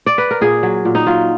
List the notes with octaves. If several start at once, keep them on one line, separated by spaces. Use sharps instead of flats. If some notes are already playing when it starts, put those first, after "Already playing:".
D5
B4
A#4
A#2 G#4
F#3
A#2
D#4
F#3 F4